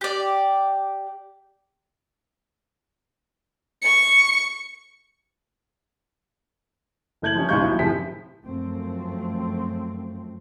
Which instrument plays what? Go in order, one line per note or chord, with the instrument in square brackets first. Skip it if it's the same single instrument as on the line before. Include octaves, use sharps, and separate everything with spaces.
[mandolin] G4 D5
[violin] C#6 C#7
[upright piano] F#1 A3 G6 G#6 F#7
F3 G3 C#4
B1 C3 G#3 F5 C#6 G6
D#2 F#3 E4
F#1 A2 C3 F3 G#4 B6
[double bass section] F#2 F3 A3 C4